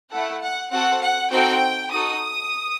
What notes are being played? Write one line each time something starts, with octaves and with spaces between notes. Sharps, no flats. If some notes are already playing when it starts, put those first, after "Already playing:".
A3 E4 A4 F#5
F#5
C4 F#4 A4 F#5
F#5
C4 D#4 F#4 A4 G5
D#4 F#4 A4 D#6